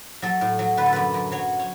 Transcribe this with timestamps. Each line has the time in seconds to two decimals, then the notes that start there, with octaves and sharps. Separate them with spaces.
0.22 F#3 A4
0.41 A2
0.59 F#3
0.77 D3 B4
0.86 A4
0.93 F#2 B4
1.14 F#2
1.32 F#3 C#5
1.59 C#5